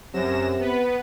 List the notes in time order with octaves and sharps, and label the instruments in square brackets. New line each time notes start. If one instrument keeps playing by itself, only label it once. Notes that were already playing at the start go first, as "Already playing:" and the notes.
[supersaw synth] F#2 A#6 E7 [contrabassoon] C3
[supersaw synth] B3 B4